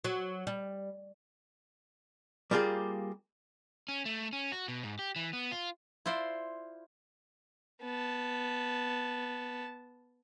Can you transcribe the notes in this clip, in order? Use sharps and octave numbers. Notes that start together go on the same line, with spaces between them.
F#3
G3
G3 A#3 F4 G4 G#4
C#4
A3
C#4
F#4
B2
G#2
G4
E3
B3
F4
E4 F4 C5 D5
B3 A5